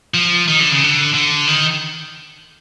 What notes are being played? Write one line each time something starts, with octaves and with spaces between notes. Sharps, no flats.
F3
D#3
D3
C#3
D3
D3
D#3